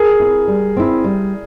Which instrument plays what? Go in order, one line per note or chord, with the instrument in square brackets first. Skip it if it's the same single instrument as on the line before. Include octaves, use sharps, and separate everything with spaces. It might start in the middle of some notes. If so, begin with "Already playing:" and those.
Already playing: [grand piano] G#4 A#4
[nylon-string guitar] C4 E4
G3
C4 E4
G3